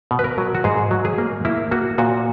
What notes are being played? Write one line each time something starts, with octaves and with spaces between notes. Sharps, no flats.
B2
B4
A#4
F#3
F#4
G#2 G#4
F#3
G#4
A#3
A#3 E4
A#3 F#4
A#2 F#4